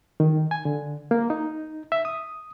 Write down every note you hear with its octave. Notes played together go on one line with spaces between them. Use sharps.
D#3
G#5
D3
A#3
D#4
E5
D#6